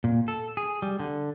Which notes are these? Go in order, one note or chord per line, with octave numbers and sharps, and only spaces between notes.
A#2
A4
G#4
G3
D3